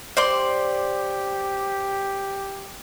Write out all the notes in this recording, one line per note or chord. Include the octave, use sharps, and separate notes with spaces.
G4 C5 D5 C6